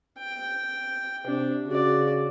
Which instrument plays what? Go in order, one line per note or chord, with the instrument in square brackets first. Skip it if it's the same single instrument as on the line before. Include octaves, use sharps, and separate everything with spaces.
[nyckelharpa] G5
[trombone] C3 [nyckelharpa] D4
[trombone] C#3 [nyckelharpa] F#4 D5